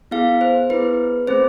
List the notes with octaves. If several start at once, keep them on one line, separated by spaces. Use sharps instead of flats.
B3 E4 G#4 F5
C5
B3 E4 G#4 B4
A3 C4 G#4 C5